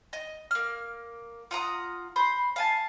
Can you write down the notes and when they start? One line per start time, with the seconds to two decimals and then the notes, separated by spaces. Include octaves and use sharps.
0.13 D#5
0.51 A#3 F6
1.51 F4 F#5 A#5 D#6
2.16 C5 B5 C6
2.56 F5 G#5 A5